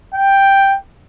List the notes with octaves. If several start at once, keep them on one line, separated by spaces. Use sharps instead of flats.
G5